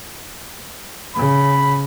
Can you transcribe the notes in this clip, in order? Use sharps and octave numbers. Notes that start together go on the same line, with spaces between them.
C#3 B5